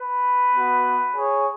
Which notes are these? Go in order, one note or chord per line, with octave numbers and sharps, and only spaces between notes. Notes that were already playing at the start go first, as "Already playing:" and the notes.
Already playing: B4
B3 F#4
G#4 C#5